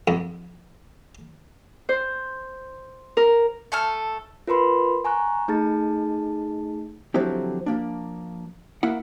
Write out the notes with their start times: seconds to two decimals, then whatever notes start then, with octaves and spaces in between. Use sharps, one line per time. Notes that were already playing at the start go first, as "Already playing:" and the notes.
0.08 F2
1.89 C5
3.17 A#4
3.72 A3 A4 F6
4.48 F4 A#4 B4 B5 C6
5.05 G#5 A#5 C#6 F#6
5.48 A3 D#4 G#4 A5 A6
7.14 D3 F3 F#3 C4 E4 G4
7.66 F3 A#3 D4
8.83 A#3 E4 F#5